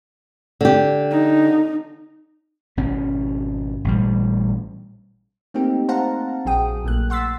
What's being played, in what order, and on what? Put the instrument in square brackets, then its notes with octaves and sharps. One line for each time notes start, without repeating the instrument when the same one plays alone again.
[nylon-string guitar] D3 G4
[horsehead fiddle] D#4
[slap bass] G#1 B2 C#4
A1 A#2 G3
[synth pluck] A3 A#3 C4 D#4 G4
C5 F5 F#5 A5 A#5
A#1 F#3 G#4 G5 D#6
A#1 A3 A#3 F#6
F#5 C6 E6 A6 B6